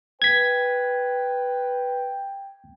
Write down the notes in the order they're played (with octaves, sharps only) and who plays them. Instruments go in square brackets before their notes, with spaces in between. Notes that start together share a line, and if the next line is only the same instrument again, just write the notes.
[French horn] B4 [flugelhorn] G5 [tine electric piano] G#6 B6